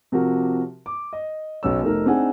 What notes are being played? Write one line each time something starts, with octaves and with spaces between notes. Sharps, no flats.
C3 F3 F#4 G4 A#4
D6
D#5
B1 B2 B3 C#4 E6
F1 A3 D#4 A#4
C4 D4 D#4 G#4 F#5 G#5